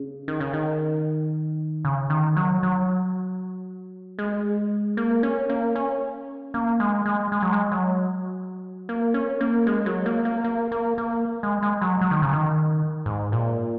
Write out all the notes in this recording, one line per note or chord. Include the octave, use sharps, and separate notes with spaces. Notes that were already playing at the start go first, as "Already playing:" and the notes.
Already playing: C#3
D#3
C#3
D#3
C#3
D#3
F#3
F#3
G#3
A#3
C#4
A#3
C#4
A#3
G#3
G#3
G#3
F#3
G#3
F#3
A#3
C#4
A#3
G#3
F#3
A#3
A#3
A#3
A#3
A#3
G#3
G#3
F#3
F#3
D#3
C#3
D#3
G#2
A#2